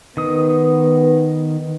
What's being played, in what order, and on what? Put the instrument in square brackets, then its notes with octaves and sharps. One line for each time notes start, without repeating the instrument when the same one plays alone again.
[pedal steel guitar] D#3 D#6 [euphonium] B3